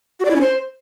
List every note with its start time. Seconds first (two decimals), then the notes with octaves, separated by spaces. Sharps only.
0.20 F#4
0.25 D5
0.30 E4
0.36 C#4
0.41 C5